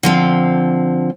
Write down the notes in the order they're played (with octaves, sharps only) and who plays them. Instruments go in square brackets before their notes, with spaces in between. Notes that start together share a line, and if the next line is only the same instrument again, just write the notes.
[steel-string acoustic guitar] D3 F3 C4